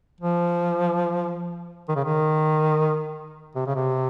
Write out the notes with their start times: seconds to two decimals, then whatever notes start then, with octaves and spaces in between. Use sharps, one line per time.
0.20 F3
1.89 D#3
1.96 C#3
2.04 D#3
3.56 C3
3.66 C#3
3.75 C3